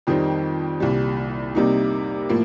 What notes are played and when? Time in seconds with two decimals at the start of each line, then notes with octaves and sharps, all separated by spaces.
0.07 F2 D#3 G3 C4 D#4
0.80 C2 A#2 G3
1.55 C3 G3 A#3 D#4
2.29 A2 F3 A#3